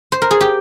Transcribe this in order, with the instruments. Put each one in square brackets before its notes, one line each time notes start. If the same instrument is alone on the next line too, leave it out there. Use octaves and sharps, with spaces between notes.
[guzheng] C5
A#4
G#4
G4